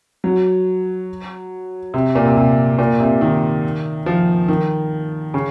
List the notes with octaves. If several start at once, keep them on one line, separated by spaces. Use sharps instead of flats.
F#3
C3
A#2
C3
C3
A#2
C3
D#3
F3
D#3
C#3